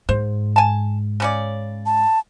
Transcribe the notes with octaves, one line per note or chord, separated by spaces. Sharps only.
G#2 C5
G#5 A5
C#3 C#4 D5
A5